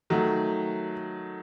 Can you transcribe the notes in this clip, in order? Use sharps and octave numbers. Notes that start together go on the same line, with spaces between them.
D#3 F#3 A3